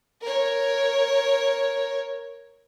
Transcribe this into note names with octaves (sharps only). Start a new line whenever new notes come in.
A#4 C#5